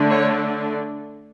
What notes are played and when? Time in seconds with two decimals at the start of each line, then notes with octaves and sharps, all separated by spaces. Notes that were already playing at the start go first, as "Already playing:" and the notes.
Already playing: D3 A3 D4
0.10 C#5